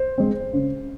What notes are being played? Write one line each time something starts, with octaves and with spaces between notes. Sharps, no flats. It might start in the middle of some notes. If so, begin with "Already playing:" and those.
Already playing: C5
G#3 C4
C#3